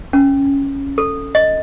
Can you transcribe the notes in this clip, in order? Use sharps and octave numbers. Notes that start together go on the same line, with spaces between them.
C#4
A4
D#5